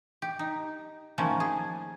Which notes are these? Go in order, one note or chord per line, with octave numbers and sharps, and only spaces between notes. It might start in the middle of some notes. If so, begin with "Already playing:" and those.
G4
D#4
D#3 F3 A3 A#3 C#4
G#4